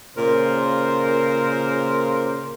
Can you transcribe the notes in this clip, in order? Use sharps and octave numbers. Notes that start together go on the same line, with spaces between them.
A#2 C#3 A#4 C5